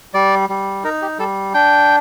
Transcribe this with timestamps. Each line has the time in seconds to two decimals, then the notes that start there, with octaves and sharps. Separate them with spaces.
0.14 G3 D5
0.49 G3
0.84 D#4 A#4
1.02 G4
1.19 G3 A4
1.54 D4 G5